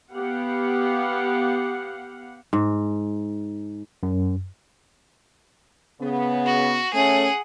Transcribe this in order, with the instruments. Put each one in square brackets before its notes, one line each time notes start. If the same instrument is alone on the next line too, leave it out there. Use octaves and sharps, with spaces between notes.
[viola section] B3 G4 F5 F#5
[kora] G#2
[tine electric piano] F#2
[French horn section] C#3 B3
[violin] F#4
[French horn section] A3 C#4 [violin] G#4 F#5